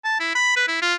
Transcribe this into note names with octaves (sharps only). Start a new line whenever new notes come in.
A5
E4
B5
B4
E4
F4